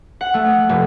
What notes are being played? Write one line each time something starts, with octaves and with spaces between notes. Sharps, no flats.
F#5
A3
F1